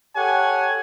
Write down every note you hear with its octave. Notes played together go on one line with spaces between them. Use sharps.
G4 A4 C#5 F#5 G#5